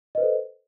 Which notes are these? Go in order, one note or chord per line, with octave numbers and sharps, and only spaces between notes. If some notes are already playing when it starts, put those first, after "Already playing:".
A4 B4 C5 D#5